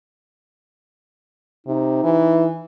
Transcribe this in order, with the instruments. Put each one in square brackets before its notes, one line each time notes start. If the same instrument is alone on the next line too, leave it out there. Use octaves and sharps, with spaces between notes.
[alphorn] C3 [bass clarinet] D#4
[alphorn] E3